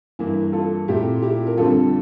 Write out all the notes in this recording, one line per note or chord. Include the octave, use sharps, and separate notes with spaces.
G2 E3 A#3 E4
A#4
F4 A4
A#2 A3 C4 E4 G4
E4 G4
A#4
F2 D3 G3 C4 F4 A4